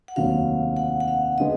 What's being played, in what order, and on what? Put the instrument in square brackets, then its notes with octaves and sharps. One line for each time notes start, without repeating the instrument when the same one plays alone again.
[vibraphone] F#5
[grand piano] F1 D#2 D3 F#3 [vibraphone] F5
[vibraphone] F#5
F#5
F5
[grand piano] D3 G#3 B3 [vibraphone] D#5